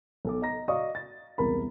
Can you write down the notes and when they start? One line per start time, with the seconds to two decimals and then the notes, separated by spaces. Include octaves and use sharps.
0.25 B1 A4 D6
0.42 D#5 A#5 A#6
0.68 F#4 D5 D#5 F5 C#6 D#6
0.95 A6
1.38 E1 C2 A#4 B5